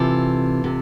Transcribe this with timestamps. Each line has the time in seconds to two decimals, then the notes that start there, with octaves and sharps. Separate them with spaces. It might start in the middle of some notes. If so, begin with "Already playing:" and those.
Already playing: C3 E3 F4 A4
0.64 C3